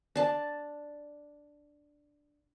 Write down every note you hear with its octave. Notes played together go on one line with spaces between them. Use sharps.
D4 A5